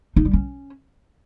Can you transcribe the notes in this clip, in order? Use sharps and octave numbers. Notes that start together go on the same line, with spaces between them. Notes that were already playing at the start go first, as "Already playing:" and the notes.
D#4
G3
C#4